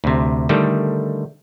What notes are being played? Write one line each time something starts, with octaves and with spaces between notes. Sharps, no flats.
D2 C3
D3 D#3 G3 A3